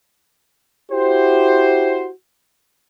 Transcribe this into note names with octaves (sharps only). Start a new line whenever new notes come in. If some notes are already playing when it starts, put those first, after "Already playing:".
E4 F#4 G4 C5